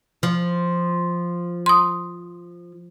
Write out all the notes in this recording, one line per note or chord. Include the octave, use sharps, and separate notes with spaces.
F3
C6 D#6